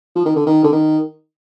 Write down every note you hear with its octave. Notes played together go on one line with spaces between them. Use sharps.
F3
D#3
D3
D#3
D3
D#3